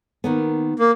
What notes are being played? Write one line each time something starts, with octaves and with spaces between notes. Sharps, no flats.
D#3 A#3 B3
A#3